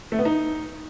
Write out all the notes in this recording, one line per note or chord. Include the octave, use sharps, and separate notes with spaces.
A3
B3
D#4